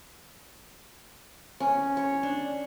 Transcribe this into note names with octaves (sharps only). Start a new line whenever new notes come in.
C#4
C#5
D4